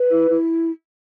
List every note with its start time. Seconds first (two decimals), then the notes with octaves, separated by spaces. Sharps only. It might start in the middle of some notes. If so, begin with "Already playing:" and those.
Already playing: B4
0.11 E4
0.29 E4